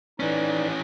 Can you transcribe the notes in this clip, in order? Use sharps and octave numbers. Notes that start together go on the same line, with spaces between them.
E3 C#4 D#4 B4 D5